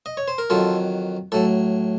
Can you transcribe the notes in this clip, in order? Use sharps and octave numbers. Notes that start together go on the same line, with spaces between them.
D#5
C#5
C5
A#4
F2 D#3 F#3 F4 A4
A2 F#3 A4